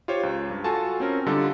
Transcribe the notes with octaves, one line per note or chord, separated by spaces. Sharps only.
F4 G4 C5 C#5
C#2
G2
F4 F#4 A4 G#5 A5
C4 C#4 A#4
D3 G3 D#4 F4 A4